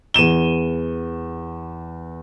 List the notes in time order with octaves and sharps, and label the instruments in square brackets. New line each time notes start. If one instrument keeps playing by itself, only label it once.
[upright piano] E2 D#7 E7 G7